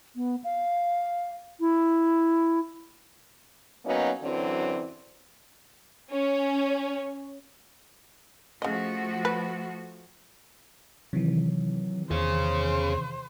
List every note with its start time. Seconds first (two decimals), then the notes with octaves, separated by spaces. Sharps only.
0.16 B3
0.44 F5
1.60 E4
3.85 F#3 A#3 B3 C#4 D#4
4.22 F#2 D3 E3 F#3 C4
6.11 C#4
8.62 C#3 F3 A3 F#4 D#5
9.25 B4
11.13 C3 D#3 E3 F#3
12.11 E2 G#4 C5 C#5